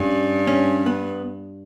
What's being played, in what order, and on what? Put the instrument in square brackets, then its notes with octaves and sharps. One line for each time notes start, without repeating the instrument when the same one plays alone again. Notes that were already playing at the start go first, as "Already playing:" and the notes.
Already playing: [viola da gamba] G2 [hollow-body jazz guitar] C#4
[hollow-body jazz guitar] C#4
B3